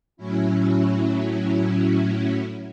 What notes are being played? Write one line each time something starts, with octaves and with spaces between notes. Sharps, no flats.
A2 F#3 C#4 E4